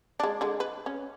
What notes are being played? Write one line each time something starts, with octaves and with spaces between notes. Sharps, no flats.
G#3 D4
D3 G#3
B4
C#4